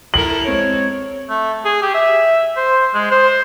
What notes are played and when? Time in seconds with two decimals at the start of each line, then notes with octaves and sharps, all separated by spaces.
0.14 E4 A4 A#4 F#7
0.46 G#3 C4 C#5
1.29 A3
1.65 G#4
1.82 G4
1.94 E5
2.57 C5
2.94 G#3
3.11 C5